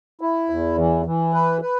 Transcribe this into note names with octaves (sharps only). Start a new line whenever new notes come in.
E4
E2
E3
E3
B4
B4